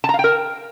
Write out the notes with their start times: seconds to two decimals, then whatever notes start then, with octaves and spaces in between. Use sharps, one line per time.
0.04 A5
0.09 A#5
0.14 F5
0.19 G5
0.24 A#4